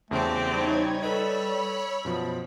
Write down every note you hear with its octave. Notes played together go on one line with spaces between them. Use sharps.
E2 C#3 A3 C4 F#4 G4 A5
G3 D#4 C#5 G#6
A4 B4 C#5 D#5 B5 C#6 E6
F#2 B2 F3